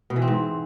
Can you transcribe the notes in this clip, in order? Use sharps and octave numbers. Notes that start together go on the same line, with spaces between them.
B2
E3
C4
G#2